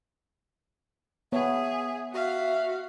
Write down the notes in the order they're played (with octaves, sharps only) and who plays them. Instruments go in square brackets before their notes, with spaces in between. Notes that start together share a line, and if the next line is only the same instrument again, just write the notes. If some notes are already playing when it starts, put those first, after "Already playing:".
[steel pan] B3 C#5 A5 [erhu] G#4 [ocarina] E5
[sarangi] F#4 [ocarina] E5 [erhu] F5